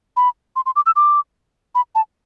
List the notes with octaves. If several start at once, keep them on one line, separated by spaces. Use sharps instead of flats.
B5
C6
C6
D6
E6
D6
B5
A5